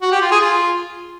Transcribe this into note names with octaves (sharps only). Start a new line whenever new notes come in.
F#4
G4
F4
G#4
F4